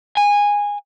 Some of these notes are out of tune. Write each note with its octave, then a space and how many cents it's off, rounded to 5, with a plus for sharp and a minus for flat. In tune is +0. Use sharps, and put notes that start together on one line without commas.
G#5 -15